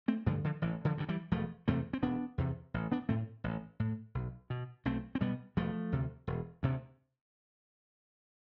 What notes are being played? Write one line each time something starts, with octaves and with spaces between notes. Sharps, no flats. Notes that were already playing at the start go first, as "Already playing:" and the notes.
A3 C4
G2 D3 F3 A3
D3 F3
A1 E3
D3 F3
G2 D3
E3 G3
E1 F3 A3
E2 C3 A3 C4
C4
E1 B3 D4
E2 C3
A1
B3 D4
A2 A3 C4
A1
A2
B1
B2
B1 A3 C4
C4
B2 G3 B3
E1 F3 A3
D2 C3
E1
D2 C3